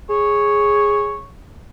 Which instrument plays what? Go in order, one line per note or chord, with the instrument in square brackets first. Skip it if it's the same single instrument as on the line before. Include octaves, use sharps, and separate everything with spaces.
[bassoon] G#4 [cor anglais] C#5